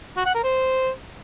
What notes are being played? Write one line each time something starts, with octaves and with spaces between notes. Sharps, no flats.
F#4
F#5
A#4
C5